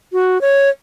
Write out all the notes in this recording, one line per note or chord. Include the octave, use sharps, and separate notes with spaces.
F#4
C#5